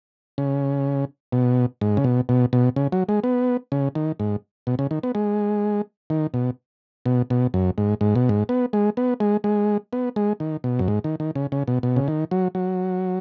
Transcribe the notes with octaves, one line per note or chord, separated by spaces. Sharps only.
C#3
B2
G#2
C#3
B2
B2
B2
C#3
F#3
G#3
B3
C#3
D#3
G#2
B2
C#3
D#3
B3
G#3
D#3
B2
B2
B2
F#2
G#2
G#2
B2
G#2
B3
G#3
B3
G#3
G#3
B3
G#3
D#3
B2
F#2
G#2
D#3
D#3
C#3
C#3
B2
B2
C#3
D#3
F#3
F#3